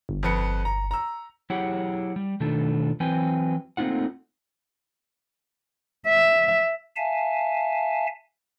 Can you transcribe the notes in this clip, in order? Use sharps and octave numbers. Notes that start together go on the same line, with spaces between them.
G1
F2 B4 C#7
A#5
A#5 E6
F#3 E4 G4 G#4 C#5 F#5
G3
B2 D#3 A3 D4 F4 A4
E3 F#3 C4 B4 G5 G#5
A3 A#3 C4 D#4 F4 F#5
E5
E5 F5 G#5 A5